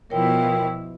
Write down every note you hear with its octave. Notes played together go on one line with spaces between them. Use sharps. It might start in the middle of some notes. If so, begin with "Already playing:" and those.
B2 F3 E4 A#4 C#5 G5